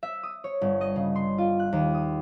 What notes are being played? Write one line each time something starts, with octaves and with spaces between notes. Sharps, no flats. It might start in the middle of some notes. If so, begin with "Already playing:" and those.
E5
D#6
C#5
G1
D#5
C#3
C6
F4
F#6
D#2
D#6